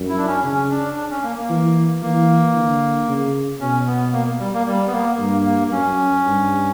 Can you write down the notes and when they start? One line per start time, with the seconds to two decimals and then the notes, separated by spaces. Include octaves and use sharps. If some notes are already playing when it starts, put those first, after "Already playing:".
Already playing: F#2
0.09 E4
0.18 D4
0.27 C#4
0.44 C#3 C#4
0.71 D4
0.96 D4
1.11 C#4
1.23 A#3
1.37 A#3
1.50 E3
2.02 E3 A#3
2.55 D3
3.08 C#3
3.61 B2 C#4
3.87 B3
4.13 A#3
4.39 G3
4.54 A#3
4.67 G3
4.87 B3
4.93 A#3
5.19 G2 A#3
5.45 A#3
5.72 F#2 C#4
6.25 G2